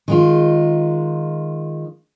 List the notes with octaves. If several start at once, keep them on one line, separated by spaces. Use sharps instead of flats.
D#3 G#3 F4